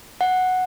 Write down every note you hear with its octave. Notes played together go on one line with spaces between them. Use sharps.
F#5